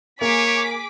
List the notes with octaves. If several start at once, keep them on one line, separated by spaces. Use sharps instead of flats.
A#3 G#4 C#5 D6 B6